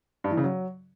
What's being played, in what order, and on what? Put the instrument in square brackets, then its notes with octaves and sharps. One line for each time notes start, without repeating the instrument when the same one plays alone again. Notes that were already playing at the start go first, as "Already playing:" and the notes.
[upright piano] G2
E3
C#3
F#3